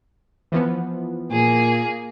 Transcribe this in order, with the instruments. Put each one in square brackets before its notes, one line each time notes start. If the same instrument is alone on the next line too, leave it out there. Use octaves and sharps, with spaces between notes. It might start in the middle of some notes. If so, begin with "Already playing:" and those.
[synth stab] E3 F3 B3
[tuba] A#2 [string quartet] A#3 G#4